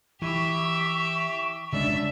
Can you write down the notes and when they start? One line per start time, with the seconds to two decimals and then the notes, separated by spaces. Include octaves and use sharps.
0.22 E3 G4 E5 C#6
1.72 C#3 G#3 D4 D5 E5